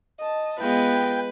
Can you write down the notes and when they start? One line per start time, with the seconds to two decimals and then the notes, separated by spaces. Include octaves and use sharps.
0.19 D#5 A5
0.60 G#3 B3 F4 B4 G5